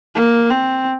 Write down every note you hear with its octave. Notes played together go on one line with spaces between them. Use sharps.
A#3
C4